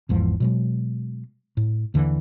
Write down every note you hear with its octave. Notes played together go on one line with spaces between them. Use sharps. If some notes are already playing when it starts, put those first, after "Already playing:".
G#1 E2 G#2 F3
B2 F#3 G#3
A2
D#2 D3 E3